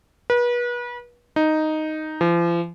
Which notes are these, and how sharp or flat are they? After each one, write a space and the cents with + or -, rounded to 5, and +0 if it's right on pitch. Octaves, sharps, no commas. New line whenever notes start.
B4 -35
D#4 +0
F3 -40